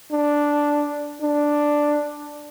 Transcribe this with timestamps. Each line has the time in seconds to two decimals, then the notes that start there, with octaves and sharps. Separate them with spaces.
0.12 D4
1.22 D4